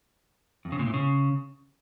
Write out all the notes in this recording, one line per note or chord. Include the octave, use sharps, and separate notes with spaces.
F2
C#3
A#2
A2
C#3